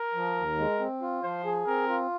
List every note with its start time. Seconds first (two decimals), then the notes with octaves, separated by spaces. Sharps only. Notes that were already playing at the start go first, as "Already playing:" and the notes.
Already playing: A#4
0.14 F3
0.36 D#2
0.58 G#3
0.80 C4
1.02 F4
1.23 F3 C5
1.45 G#4
1.67 C4 A#4
1.88 F4